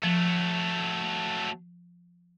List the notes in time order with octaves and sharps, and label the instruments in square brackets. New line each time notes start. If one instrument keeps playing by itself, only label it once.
[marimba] F3 [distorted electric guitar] F#3 A3